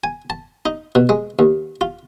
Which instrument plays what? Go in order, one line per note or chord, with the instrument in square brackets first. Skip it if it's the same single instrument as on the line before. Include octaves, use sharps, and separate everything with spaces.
[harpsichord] G#5
A5
D#4
B2
G#3
D#2
F4